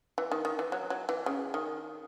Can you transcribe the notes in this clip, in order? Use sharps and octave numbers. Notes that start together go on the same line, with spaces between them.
E3
D#3
D#3
E3
F#3
F#3
E3
C#3
D#3